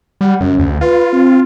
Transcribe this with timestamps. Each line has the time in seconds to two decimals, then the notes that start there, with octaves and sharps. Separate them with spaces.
0.21 G3 F#5
0.40 F#2 C#3
0.58 D2
0.81 F4 B4
1.13 C4